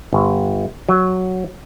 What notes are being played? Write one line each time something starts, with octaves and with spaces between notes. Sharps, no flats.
G1
F#3